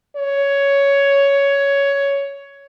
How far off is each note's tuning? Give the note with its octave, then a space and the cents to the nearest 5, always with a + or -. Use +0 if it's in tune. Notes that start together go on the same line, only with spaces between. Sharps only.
C#5 +10